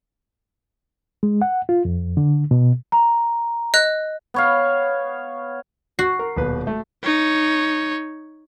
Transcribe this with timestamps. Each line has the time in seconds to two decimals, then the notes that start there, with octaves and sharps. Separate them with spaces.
1.23 G#3
1.42 F#5
1.69 F4
1.85 F2
2.17 D3
2.51 B2
2.92 A#5
3.74 D#5 F#6
4.34 B3 C#5 F5
5.99 F#4 C7
6.19 A#4
6.37 D#1 B2 B4
6.67 A3
7.03 D#4 C#5